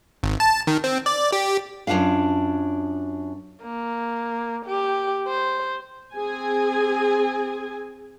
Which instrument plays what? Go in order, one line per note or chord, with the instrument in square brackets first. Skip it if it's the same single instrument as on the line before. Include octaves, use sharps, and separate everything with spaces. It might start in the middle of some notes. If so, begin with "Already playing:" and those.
[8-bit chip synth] G#1
A5
D#3
C4
D5
G4
[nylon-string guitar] F#2 E3 D4 F4 F5
[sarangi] A#3
G4
C5
[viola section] C4 G#4 G#5